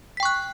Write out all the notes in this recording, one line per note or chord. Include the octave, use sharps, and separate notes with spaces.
G5 C#6 F#6 B6